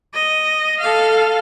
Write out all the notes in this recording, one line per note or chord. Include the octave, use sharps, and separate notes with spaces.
D#5
A4 F5